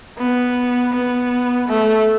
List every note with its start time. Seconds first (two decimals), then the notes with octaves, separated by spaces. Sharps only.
0.18 B3
0.93 B3
1.68 A3